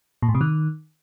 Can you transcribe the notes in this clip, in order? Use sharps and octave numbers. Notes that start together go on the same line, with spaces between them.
A#2
A2
C3
D#3